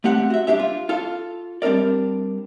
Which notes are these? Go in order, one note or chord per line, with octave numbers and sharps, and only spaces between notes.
A3 C4 G4 F#5
F#4 E5
G2 D#3 D4 G4 E5
F4
F4 A4 F5
G3 C4 D4 A#4 D5